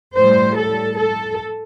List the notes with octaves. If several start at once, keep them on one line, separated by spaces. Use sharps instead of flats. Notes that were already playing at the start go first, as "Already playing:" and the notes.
A2 G3 C5
A4
A4